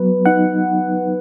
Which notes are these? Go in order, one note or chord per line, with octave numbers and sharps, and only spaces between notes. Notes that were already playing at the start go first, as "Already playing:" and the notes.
Already playing: F#3 B3 B4
D#4 F#5